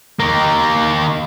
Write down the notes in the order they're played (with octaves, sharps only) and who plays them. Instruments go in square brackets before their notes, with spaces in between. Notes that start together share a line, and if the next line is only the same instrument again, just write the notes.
[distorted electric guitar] D#3 A#3